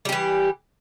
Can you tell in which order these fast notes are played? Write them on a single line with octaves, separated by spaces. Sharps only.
G3 G4 E3